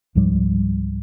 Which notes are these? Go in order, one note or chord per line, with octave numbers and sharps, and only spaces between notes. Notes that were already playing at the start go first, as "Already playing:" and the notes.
C#2 G#2 F3 G3